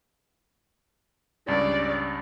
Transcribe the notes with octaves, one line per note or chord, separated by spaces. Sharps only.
C#2 G2 C#4 D5